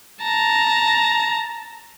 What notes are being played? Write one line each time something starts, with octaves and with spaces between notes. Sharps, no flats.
A5 A#5